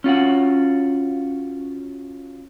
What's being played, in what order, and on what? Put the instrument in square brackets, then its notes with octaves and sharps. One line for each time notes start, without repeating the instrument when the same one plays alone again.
[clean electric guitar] C#4 F4 F#4 F#5